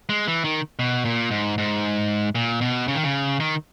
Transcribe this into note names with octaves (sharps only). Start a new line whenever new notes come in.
G#3
E3
D#3
B2
A#2
G#2
G#2
A#2
B2
C#3
D#3
C#3
D#3